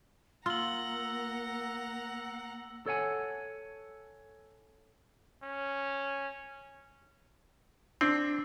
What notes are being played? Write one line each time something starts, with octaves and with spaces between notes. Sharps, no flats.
A#3 F4 F#5 A#5 E6 F#7
A4 C#5 F#5 G#5
C#4
C4 D4